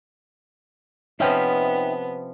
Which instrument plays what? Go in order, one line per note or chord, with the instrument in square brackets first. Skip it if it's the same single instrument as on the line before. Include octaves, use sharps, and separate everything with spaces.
[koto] C3 F3 C#4 [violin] B3 [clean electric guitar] D#4 E5 G5